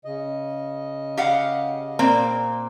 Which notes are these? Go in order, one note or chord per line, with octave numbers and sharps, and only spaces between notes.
C#3 D#5
G4 F5 F#5
A#2 A#3 C4